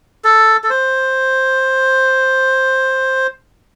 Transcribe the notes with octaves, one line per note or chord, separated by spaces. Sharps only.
A4
A4
C5